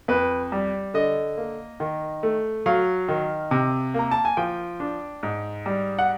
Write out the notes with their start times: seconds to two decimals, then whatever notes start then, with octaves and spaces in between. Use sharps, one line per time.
0.08 F2 B4
0.52 G3
0.94 D3 D#5
1.37 A#3
1.80 D#3
2.23 A3
2.66 F#3 F5
3.09 D#3
3.51 C3
3.94 A#3 A#5
4.11 A5
4.25 G#5
4.37 F3 G5
4.80 D4
5.23 G#2
5.66 G3
5.99 F#5